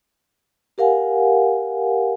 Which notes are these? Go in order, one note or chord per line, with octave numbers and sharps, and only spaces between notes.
G4 A#4 F5 F#5 G#5